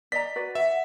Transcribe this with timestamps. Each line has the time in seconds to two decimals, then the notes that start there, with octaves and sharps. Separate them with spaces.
0.12 D5 D#5 A#5 B6
0.36 F#4 B4 D5
0.55 E5 F#5